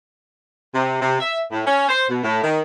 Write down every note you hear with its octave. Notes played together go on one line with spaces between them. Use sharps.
C3
C3
E5
A2
C#4
C5
B2
A2
D#3